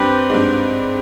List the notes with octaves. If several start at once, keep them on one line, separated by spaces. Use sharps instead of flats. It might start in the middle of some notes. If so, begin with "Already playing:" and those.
Already playing: G2 C4 G4 B4
G#2
G2